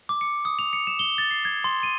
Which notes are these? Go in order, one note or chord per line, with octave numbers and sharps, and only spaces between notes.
D6
C#7
D#6
F7
C#7
E7
G7
A6
C7
G#6
C6
D#7